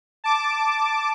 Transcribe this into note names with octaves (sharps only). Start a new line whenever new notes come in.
A5 D6